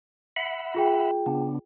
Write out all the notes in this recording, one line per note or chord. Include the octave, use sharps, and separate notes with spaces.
E5 F#5 B5
F4 G#4 G5
C#3 B3 D4